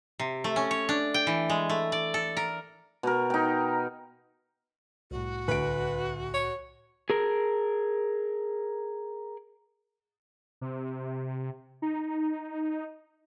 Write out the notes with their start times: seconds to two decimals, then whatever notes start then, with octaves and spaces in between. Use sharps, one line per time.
0.19 C3
0.44 A3
0.56 C#4
0.71 C#5
0.89 D4
1.14 G5
1.27 E3
1.50 G#3
1.70 A3
1.92 D5
2.14 A4
2.37 A#4
3.03 B2 A#4
3.30 D#4 G5
5.11 C2 A2 F#4
5.48 D2 B4 D7
6.34 C#5
7.10 G#4 A#4
10.61 C3
11.82 D#4